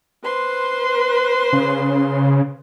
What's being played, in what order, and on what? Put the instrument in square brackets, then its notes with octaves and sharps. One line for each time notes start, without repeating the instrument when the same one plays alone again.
[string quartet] B4 C5 C6
[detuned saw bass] C#3